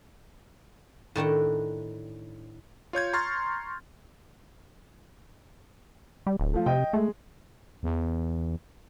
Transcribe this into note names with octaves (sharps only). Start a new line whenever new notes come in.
A2 D#3 D4 F#5
F4 C#5 G6 G#6
A#5 C6 C#6 F6 A6
G3
D1
F3 A3
C3 D#5 G5
G#3 A3
E2